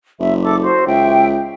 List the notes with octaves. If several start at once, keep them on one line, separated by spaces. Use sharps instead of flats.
F#1 E5
A4 D6
F#4 C5
C#2 E5 G5